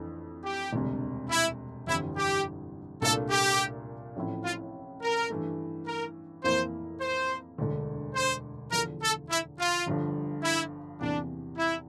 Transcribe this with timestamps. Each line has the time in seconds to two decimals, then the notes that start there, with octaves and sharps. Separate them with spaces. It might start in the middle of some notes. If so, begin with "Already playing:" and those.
Already playing: F2 E3 A3 D4
0.44 G4
0.73 E1 D2 C3 G3
1.30 E4
1.87 G1 F2 E3 G3 E4
2.16 G4
3.02 C2 A#2 A3 D4 F4 A4
3.30 G4
4.16 A1 A2 F3 C4 E4
4.44 F4
5.02 A#4
5.30 G2 E3 A3
5.86 A#4
6.44 F2 E3 A#3 E4 C5
7.01 C5
7.58 E1 D2 D3
8.15 C5
8.72 E2 D3 F3 A#4
9.01 A4
9.30 E4
9.58 F4
9.86 G1 G2 D3 F3
10.43 E4
11.00 E2 C3 E3 A#3 D4
11.58 E4